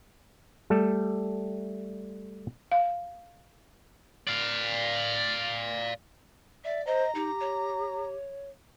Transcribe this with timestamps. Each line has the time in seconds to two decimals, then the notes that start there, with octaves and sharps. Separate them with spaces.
0.70 G3 A3 A4
2.72 F5
4.27 D5 F5
6.64 D5 E5
6.86 C5 D#5 A#5
7.15 D#4 G4
7.40 C#5